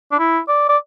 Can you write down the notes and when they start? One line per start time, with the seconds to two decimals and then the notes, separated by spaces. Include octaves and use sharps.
0.12 D4
0.19 E4
0.48 D5
0.69 D5